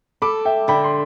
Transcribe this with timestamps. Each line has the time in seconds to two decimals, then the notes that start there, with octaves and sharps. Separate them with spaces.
0.22 A4 B5 D6
0.45 E5 G5
0.68 D3 G5 B5
0.84 C6